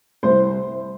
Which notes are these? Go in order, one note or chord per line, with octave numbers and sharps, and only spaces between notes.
C2 C5